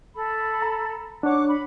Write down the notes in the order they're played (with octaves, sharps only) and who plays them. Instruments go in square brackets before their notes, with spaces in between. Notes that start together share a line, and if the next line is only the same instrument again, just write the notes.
[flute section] A4 B5
[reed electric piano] A#5
[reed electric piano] D4 C#5 [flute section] F#5 D6 F#6
[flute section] B5